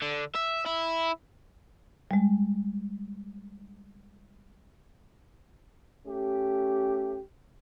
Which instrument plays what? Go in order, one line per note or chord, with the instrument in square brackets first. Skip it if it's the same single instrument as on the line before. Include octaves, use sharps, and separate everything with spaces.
[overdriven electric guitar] D3
E5
E4
[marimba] G3 G#3
[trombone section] A3 C#4 G4